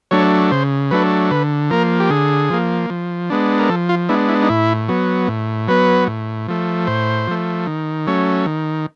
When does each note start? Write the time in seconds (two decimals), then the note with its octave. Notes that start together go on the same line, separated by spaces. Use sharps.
0.11 F#3 A3 D4 C#5
0.51 C#3 C5
0.91 F#3 A3 D4 B4
1.31 D3 B4
1.70 F3 A#3 A#4
2.00 G4
2.10 D3 G#4
2.50 F3 A#3
2.90 F3
3.30 G#3 B3 D4
3.59 A#4
3.69 F3 A4
3.89 F4
4.09 G#3 B3 D4 E4
4.28 E4
4.42 D#4
4.49 A2 E4
4.88 F#3 B3
5.28 A2
5.68 F#3 B3 B4
6.07 A2
6.48 F3 A3
6.87 A2 C5
7.28 F3 A3
7.67 D#3
8.07 F#3 A3 C#4
8.46 D#3